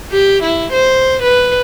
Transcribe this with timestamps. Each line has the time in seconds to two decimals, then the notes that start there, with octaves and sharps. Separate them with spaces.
0.12 G4
0.44 E4
0.73 C5
1.23 B4